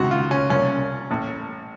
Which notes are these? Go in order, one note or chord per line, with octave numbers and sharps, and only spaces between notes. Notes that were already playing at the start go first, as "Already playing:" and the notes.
Already playing: C#2 C3 D#3 F#4
F4
C#4
C2 A#2 C#4
A1 A2